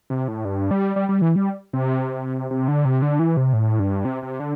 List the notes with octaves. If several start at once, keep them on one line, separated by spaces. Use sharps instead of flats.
C3
A2
G2
G3
G3
G3
E3
G3
C3
C3
D3
C3
D3
E3
C3
A2
G2
C3
C3
D3